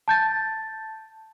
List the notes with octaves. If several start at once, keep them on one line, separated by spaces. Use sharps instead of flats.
A5 G6 A6